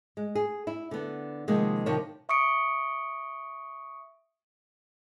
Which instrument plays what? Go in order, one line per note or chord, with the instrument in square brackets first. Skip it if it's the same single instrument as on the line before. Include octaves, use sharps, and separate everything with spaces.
[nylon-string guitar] G#3
G#4
E4
D3 B3
C3 D#3 F3 G#3 A#3
C3 D#3 F3 A#4 C#5 A5
[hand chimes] E5 C#6 D#6 C#7 D7